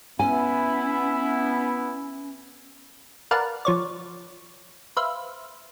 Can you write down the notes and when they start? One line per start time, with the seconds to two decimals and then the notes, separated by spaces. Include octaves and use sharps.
0.19 B3 C#4 E4 G#5
3.31 A#4 B4 D5 F5 F#5 A5
3.65 F3 C#5 D5
4.97 B4 C5 E5 F5